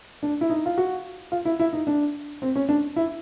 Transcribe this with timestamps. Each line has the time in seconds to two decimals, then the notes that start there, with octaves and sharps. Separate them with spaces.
0.23 D4
0.41 E4
0.50 D#4
0.66 F4
0.78 F#4
1.32 F4
1.45 E4
1.60 E4
1.73 D#4
1.87 D4
2.42 C4
2.56 C#4
2.69 D4
2.96 E4